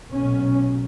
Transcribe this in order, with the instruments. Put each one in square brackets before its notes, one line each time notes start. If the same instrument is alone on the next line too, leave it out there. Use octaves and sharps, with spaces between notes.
[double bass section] B1 A#2 C#4